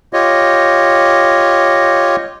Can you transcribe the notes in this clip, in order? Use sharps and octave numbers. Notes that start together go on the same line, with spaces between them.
F4 G4 C#5 D#5